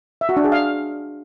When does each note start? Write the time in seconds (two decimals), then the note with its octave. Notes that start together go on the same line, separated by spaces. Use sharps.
0.21 E5
0.29 F#4
0.37 D4
0.44 G#4
0.52 F5